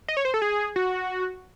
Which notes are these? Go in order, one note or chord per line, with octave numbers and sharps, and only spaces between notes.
D#5
C#5
C5
A4
G#4
F#4